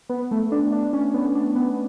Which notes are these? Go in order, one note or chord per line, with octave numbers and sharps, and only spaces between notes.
B3
A3
D4
D4
C#4
B3
D4
B3